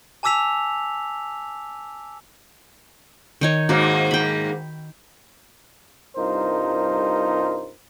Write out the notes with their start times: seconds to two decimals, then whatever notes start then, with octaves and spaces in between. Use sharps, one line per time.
0.23 G#5 A5 D6 E6 B6 F7
3.41 D#3 D#4 C#5
3.69 G#2 A#3 F#4
4.11 G5 B5
6.16 C2 G2 D#4 F4 A#4 C5